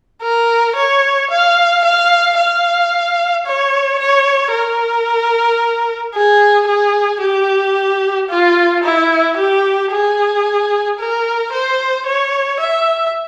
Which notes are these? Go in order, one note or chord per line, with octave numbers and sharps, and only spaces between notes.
A#4
C#5
F5
F5
F5
C#5
C#5
A#4
G#4
G#4
G4
F4
E4
G4
G#4
A#4
C5
C#5
E5